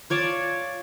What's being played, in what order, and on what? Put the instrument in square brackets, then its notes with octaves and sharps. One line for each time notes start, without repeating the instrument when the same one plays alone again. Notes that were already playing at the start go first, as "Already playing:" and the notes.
[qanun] F4 C#5 D5 A5